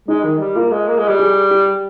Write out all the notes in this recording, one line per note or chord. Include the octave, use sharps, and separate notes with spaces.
G#3 D#4
D#3
G3
A#3 F4
G#3
A#3
G#3
G3
G#4
G4